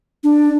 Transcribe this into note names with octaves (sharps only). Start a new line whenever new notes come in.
D4